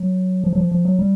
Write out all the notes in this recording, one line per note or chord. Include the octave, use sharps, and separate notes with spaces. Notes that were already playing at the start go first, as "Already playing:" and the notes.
Already playing: F#3
F3
F#3
F3
F3
F#3
G3